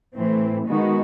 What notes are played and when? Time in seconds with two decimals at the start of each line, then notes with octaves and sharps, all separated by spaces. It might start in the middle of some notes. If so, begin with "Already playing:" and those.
0.16 A2 E3 A3 C4
0.66 D#3 G#3 B3 D#4 F#4